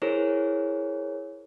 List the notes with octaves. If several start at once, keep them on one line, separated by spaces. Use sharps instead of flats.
E4 G#4 A#4 C5 C#5